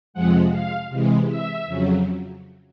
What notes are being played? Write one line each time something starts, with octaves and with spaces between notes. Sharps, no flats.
F2 C3 F3 G#3 F#5
F5
C3 E3 G#3
E5
F2 C#3 F#3